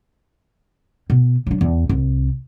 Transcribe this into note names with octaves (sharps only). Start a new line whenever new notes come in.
B2
F#3 D4
E2
C2